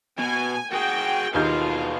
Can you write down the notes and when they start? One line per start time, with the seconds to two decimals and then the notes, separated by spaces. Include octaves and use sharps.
0.19 B2 G#5
0.73 F#4 G#4 G5
1.34 D#2 B2 D#4 F4 G#4 F5 G6